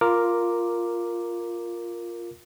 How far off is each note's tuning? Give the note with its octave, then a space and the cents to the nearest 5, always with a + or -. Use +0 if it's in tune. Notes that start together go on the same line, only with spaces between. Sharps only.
F4 +0 A#4 +0 D6 +0